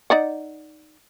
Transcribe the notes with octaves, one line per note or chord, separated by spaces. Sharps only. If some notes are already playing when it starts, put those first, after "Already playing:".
D#4 D5 F#5